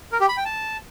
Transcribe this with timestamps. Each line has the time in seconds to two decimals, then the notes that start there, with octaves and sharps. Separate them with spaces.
0.12 A#4
0.20 G4
0.29 B5
0.37 G5
0.45 A5